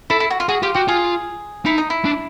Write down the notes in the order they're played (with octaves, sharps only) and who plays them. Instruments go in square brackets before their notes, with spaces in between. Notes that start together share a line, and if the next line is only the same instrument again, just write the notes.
[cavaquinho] E4 [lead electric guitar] A4
[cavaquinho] E4
F#4
F4
[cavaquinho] F#4 [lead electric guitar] G#4
[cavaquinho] F4 [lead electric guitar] G4
[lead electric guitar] F#4 [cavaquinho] G4
[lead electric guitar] F4 [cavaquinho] G#4
[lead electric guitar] D#4 [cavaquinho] E4
[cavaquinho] D#4
E4
[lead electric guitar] D4